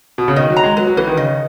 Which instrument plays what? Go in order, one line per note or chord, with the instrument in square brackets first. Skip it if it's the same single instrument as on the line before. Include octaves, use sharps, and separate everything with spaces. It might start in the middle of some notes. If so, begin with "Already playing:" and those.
[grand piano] B2
C#3
[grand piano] D#3 [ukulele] D#5
[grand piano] F#3
[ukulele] A#5
[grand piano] G#3
[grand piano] F#3 [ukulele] B4
[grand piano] F#3
[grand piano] E3 [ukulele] B4
[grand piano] D#3
[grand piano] C#3 [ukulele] D#5